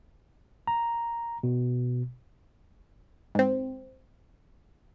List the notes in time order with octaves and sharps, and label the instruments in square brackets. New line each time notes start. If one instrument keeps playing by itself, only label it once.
[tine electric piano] A#5
B2
[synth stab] G#2 C4